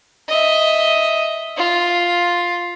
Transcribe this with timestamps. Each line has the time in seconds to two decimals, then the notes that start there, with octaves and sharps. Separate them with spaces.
0.29 D#5 E5
1.57 F4